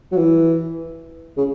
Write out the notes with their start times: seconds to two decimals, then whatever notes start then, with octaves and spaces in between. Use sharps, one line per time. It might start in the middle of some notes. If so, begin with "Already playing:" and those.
0.12 F#3
0.17 E3
1.37 C#3